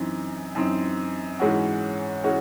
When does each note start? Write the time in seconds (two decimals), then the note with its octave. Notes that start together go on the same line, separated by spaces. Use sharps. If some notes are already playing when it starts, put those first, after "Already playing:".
Already playing: F#2 E3 C4 D#4
0.55 F#2 E3 C4 D#4
1.40 G#2 E3 G#3 C#4 F#4
2.24 E3 G#3 C#4 F#4